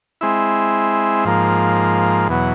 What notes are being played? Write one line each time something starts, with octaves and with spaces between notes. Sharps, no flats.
G#3 C4 E4
G#2 F3 A#3
E2 B2 F#3